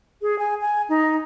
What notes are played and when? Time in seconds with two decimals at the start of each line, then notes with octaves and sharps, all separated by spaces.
0.22 G#4
0.39 G#5
0.62 G#5
0.89 D#4